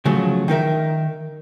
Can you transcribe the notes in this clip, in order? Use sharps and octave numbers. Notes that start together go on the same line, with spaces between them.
C#3 F3 F#3 A3
D#3 D#4 A#4 E5